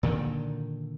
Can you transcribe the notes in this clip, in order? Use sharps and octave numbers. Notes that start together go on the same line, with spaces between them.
A#2 D3 D#3